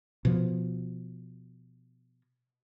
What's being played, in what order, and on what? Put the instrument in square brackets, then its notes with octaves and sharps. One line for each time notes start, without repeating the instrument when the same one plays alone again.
[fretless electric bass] B2 F3